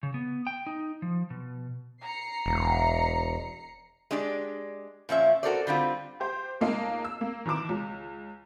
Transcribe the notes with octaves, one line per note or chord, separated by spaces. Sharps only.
C#3
B3
G5
D#4
F3
B2
A#5 C7 C#7
E1
G#3 D4 G4 D5
A#2 F3 C#4 E5
F#4 G4 A4 A#4 C5 D5
D3 G3 C4 F4
G4 C5
C#2 A#3 D#4 D#5 F5 A5
E6
A#3
D#3 E3 A5 D6 E7
C#2